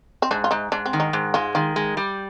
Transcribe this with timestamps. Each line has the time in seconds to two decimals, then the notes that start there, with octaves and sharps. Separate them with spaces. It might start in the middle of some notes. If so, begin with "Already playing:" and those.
0.22 C4
0.31 G#2 D4
0.44 F4
0.51 G#2 D#4
0.72 G#2 D4
0.86 C4
0.93 D#3
1.00 D#4
1.13 G#2
1.34 G#3 F4
1.55 D#3 F4
1.76 G#3
1.97 G3